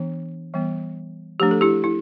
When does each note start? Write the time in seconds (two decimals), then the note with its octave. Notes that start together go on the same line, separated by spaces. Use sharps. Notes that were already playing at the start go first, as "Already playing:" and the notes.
Already playing: E3 B3 D4
0.54 E3 G3 B3
1.40 F3 A3 D4 G4
1.51 A4
1.61 E4 G4
1.84 E4